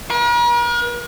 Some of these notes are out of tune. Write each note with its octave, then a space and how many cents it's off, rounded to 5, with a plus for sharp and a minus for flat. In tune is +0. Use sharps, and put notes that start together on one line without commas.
A#4 +45